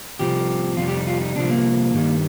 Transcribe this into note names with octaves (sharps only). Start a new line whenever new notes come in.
C2 C3 F3 G4
F2 C3 G3 F4
G4
D#4
F4
D#4
C2 C3 F3 D4
A#3
G2 D#3 G3